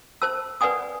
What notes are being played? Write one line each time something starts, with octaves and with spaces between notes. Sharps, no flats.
C5 A5 E6
B4 D5 F#5 G#5 D#6